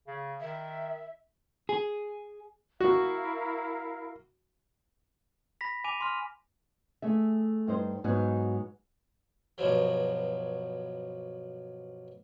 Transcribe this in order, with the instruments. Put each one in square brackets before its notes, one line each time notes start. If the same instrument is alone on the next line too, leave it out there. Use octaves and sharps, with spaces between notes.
[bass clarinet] C#3
[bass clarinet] D#3 [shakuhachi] E5
[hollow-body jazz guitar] G#4
[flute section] E4 A#4 F5 [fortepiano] F#4
[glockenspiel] B5 A#6 B6
G#5 D6 D#7 F7
C6 F6
[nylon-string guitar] A3 G#4 E5
G2 D#4 C5
G#2 F#3 B3 D#4
[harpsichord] G2 B2 F3 F#3